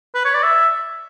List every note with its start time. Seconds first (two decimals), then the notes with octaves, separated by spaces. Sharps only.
0.15 B4
0.25 C#5
0.34 D5
0.43 E5